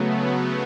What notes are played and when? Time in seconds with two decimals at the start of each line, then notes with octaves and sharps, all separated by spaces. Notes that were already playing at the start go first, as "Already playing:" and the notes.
Already playing: C#3 F#3 A3 B3
0.14 B3